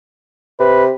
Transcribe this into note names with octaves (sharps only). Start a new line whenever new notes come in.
C3 B4